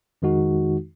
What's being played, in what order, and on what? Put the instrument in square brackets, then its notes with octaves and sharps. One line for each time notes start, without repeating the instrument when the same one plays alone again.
[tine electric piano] F2 D#3 G#3 D#4 F#4